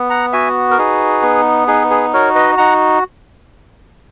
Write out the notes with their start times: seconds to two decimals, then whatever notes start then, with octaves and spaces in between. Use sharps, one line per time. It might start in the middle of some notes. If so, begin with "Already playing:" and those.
Already playing: B3
0.10 F#5 A#5
0.32 F#4 E5 G#5
0.71 A#4
0.78 D#4 G#4 B4
1.23 B3
1.67 D#4 G#4 B4
1.90 G#4 B4
2.14 F#4 A#4 C#5
2.35 B4 D#5
2.58 D#4 F#5 A#5